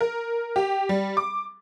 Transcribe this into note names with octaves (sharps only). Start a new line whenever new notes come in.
A#4
G4
G3
D6